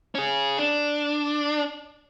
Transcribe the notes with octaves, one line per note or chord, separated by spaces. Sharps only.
C#4 G#4
D4